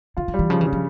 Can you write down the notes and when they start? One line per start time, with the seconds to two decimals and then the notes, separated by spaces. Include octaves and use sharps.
0.17 C#3 F4
0.28 D3
0.34 G3
0.39 E3
0.50 C#3 F3
0.61 E3
0.66 C#3
0.73 F3